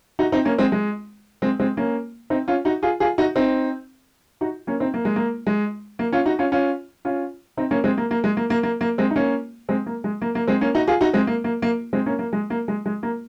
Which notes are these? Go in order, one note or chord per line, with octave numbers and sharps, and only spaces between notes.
D#4 F#4
C4 D#4
A#3 C#4
G#3 C4
G#3
G#3 C4
G#3 C4
A#3 C#4
C4 D#4
C#4 F4
D#4 F#4
F4 G#4
F4 G#4
D#4 F#4
C4 D#4
D#4 F#4
A#3 C#4
C4 D#4
A#3
G#3
A#3
G#3
A#3
C#4 F4
D#4 F#4
C#4 F4
C#4 F4
C#4 F4
C4 D#4
A#3 C#4
G#3 C4
A#3
A#3
G#3
A#3
A#3
A#3
A#3
G#3 C4
D#4
A#3 C#4
G#3 C4
A#3
G#3
A#3
A#3
G#3 C4
A#3 C#4
D#4 F#4
F4 G#4
D#4 F#4
G#3 C4
A#3
A#3
A#3
G#3 C4
A#3 C#4
A#3
G#3
A#3
G#3
G#3
A#3